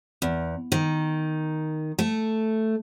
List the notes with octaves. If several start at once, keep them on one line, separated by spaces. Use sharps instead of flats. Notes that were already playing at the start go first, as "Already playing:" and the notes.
E2
D#3
A3